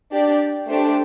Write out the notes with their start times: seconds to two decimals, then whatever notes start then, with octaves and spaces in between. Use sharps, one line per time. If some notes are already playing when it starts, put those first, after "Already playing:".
0.11 D4 G4 D5
0.68 A3 D4 G4 C5